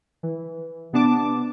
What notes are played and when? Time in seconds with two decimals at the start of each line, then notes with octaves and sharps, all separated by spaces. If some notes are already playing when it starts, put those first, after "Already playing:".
0.23 E3
0.93 C3 B3 D4 A5 D6